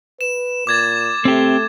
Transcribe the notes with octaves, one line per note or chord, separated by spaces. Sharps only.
B4 E7
A#2 D6 G#6 A6
A3 C4 G4